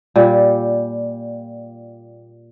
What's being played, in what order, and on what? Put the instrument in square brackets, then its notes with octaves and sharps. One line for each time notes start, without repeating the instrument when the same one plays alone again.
[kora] A#2 G3